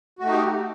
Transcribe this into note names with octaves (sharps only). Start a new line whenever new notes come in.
A3 D#4 F#4 G4